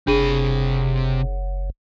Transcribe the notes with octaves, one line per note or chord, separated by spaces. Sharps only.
F#1 C3 D4 G#4 B5 D#7